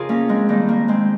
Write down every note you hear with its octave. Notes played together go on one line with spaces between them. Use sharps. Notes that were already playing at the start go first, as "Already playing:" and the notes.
Already playing: F2 C#3 F4 G#4 A#4
A#3 C#4
G#3 C4
F2 D#3 G3 A#3
A#3
G#3 C4